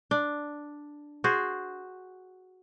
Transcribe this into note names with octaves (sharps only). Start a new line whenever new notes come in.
D4
F#4 G#4 C5